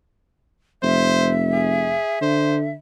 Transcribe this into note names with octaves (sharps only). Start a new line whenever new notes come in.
F1 C5 E5
G#4
D3 C5